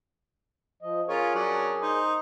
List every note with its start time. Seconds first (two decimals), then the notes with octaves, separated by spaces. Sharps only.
0.82 F3 D#5
1.09 C#4 F4 G#4 A#4 C#5
1.35 F#3 C#4 D4
1.81 D#4 C5